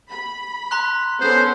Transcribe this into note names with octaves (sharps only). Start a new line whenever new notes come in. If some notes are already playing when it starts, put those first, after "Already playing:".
B5
A#5 C6 F#6
B3 C#4 A4 C5